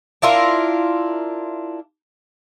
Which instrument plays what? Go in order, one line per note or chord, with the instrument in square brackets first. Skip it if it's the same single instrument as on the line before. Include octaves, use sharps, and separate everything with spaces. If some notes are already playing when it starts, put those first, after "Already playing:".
[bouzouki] D4 E4 F4 A#4